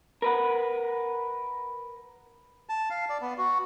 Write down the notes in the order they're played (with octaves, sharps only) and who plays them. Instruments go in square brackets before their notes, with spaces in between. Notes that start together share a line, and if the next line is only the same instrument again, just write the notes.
[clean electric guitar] A#4 B4 F#5
[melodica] A5
F5
D5
B3
F#4